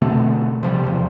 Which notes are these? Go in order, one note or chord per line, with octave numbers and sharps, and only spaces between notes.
B2 D3 A3 C4
C3 F3 G3
E2 F3